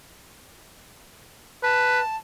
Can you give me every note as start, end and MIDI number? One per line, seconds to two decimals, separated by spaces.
1.63 2.00 71
1.63 2.17 81